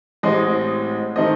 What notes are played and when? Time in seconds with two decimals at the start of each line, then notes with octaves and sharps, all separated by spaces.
0.23 A1 A2 G#3 C4 D#5
1.16 D#3 A3 C4 D#5